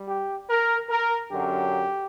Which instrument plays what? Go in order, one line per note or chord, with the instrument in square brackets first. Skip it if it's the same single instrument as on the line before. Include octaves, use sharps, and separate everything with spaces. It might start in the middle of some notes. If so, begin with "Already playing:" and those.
Already playing: [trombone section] G3
G4
A#4
A#4
F#2 D3 F#3 G4